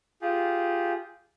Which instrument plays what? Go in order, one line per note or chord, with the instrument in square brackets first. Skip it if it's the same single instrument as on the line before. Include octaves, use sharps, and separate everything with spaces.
[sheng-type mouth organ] F4 G4 G#4